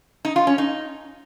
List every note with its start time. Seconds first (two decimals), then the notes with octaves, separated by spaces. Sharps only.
0.25 D#4
0.36 F4
0.47 C#4
0.58 D#4